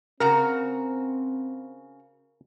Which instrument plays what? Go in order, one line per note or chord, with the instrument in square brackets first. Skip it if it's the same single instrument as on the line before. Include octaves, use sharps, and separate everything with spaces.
[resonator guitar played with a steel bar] C#3 F#4 A#5 [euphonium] C4 [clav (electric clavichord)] A#4